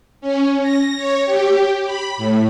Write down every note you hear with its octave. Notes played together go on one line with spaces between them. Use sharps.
C#4
A#6
C#5
G4
B5
A2